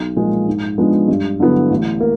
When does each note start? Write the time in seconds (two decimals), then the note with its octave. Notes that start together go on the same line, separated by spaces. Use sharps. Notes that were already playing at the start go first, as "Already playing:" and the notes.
Already playing: B1
0.16 A#2 F3 G#3
0.48 G#2
0.78 F3 G#3 B3 D4
1.08 G2
1.40 D3 F#3 B3 E4
1.70 A1
2.00 A#3